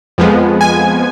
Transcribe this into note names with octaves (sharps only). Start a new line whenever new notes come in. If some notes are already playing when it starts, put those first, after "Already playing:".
F2 F3 G#3 B3
G#5